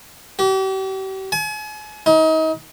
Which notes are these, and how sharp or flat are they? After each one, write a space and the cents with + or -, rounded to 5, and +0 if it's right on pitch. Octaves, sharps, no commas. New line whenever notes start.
G4 -40
G#5 +40
D#4 +35